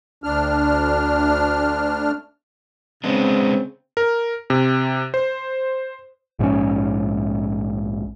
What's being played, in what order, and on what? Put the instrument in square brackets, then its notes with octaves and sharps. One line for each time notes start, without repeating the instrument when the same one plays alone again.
[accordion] D2 D4 F6
[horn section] C#3 C4 [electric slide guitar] G#3 B3 D4
[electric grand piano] A#4
C3
C5
[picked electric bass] A#1 G#2 C3 C#4